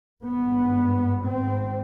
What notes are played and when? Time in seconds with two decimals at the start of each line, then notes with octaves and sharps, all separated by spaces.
0.22 G#1 G2 B3
1.23 G#1 G#2 C4